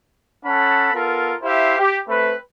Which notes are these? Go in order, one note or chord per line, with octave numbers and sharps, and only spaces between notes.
C#4 A4 F#5 A5 B5
B3 F4 A4 A#4
E4 G4 C5 E5 F5
G4
A3 C4 B4